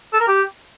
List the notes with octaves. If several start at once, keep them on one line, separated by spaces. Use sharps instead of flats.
A4
A#4
G4